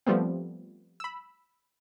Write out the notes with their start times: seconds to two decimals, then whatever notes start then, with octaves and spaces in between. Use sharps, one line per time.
0.06 F3 G3 A3 B3 C4
1.00 B5 E6